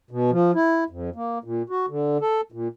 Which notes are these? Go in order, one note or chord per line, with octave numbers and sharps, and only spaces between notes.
B2
F3
E4
F2
A#3
A#2
F#4
D3
A4
A#2